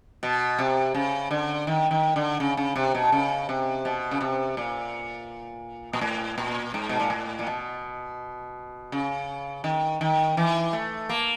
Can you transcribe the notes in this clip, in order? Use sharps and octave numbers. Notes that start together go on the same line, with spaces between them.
B2
C3
C#3
D3
D#3
D#3
D3
C#3
C#3
C3
B2
C#3
C3
B2
C#3
C3
A#2
A#2
A2
A#2
G#2
B2
A#2
A2
A#2
B2
C#3
D#3
D#3
E3
A3
A#3